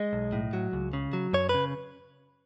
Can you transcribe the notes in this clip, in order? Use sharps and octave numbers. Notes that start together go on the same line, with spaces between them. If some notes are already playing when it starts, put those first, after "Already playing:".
Already playing: G#3 D#5
B1
A2
F#3
C#2
C#3
F#3
F#2 C#5
B4
C#3